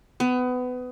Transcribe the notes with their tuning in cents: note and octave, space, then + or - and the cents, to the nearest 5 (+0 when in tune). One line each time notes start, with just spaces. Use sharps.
B3 +25